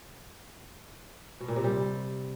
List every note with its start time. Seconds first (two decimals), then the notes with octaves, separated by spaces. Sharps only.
1.40 B2
1.48 A#2
1.56 C3
1.64 G3